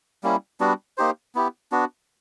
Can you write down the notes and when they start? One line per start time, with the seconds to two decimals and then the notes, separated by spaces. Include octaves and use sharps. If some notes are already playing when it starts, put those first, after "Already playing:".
0.23 G3 A#3 C#4 E4
0.60 G3 B3 D4 F#4
0.97 A#3 D#4 G4 C5
1.35 B3 E4 G4
1.72 B3 D4 F#4